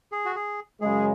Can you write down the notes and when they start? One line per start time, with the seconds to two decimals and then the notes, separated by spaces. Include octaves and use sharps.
0.12 G#4
0.25 F#4
0.36 G#4
0.81 F#2 C#3 G#3 G#4